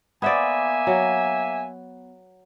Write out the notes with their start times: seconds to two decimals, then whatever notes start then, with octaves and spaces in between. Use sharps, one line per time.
0.22 A#3 B3 C5 D5 E5 G#5
0.87 F#3